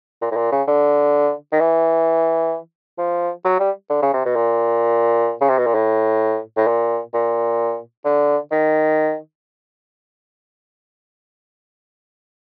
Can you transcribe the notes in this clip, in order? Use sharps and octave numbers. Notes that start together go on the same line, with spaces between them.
A#2
A2
A#2
C#3
D3
D#3
E3
F3
F#3
G3
D3
C#3
C3
B2
A#2
C#3
C3
B2
A#2
A2
A2
A#2
A#2
D3
D#3